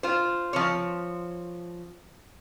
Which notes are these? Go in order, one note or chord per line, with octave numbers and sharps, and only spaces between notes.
F4 C5
F3 C4 C#5